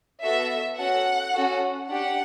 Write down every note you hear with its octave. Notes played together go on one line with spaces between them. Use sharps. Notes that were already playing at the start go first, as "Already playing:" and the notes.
B3 F#4 A4 E5
C#4 F#4 A4 F#5
C#4 F#4 A4
D4 G4 F#5